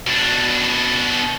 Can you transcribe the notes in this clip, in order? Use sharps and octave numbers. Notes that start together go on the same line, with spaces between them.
B2 D4